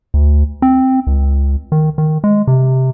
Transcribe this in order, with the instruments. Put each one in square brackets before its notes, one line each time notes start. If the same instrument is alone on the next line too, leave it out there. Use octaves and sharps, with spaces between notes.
[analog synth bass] D2
C4
C#2
D#3
D#3
G#3
C3